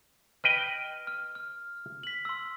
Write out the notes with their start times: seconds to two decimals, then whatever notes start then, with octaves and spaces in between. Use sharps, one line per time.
0.44 B4 D#5 G5 F6
1.07 F6
1.35 F6
2.03 B6 F#7
2.25 C6 E6